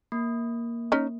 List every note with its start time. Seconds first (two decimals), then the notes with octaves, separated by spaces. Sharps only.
0.12 A#3
0.92 C#4 D#4